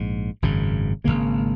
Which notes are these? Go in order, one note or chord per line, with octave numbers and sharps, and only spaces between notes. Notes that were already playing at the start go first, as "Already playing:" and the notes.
Already playing: A#1 G#2
G#1 F#2 C#3
G#1 F#2 C#3 A#3